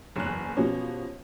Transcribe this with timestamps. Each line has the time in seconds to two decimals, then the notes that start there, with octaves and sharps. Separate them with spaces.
0.16 F#1 E2 F#6
0.56 B2 F3 C#4 G4